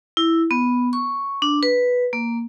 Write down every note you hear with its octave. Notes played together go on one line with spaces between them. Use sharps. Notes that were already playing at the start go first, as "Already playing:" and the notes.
E4
B3
C#6
D4
B4
A#3